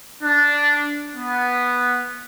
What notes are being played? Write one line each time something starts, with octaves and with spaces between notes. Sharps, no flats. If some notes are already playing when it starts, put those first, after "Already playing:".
D4
B3